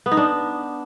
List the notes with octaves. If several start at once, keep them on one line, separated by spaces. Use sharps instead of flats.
B3
D#4
D4